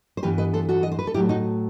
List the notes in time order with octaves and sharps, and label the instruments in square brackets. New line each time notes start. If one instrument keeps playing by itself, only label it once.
[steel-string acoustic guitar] C5
G2 E3 B3 G4 B4
B4 D#5
A4 C5
F#4 A4
D#5
C5
B4
A4
A2 F#3 A3 E4 G4
D#4 F#4